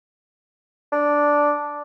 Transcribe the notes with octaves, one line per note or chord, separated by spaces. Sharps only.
D4